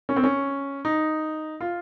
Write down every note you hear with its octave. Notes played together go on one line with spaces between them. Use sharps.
C#4
C4
C#4
D#4
F4